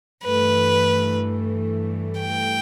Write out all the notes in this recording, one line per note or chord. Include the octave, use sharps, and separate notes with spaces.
G2 E3 A3 B4
G5